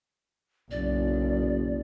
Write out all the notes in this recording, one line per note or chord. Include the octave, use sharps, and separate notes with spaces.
F#1 B1 D5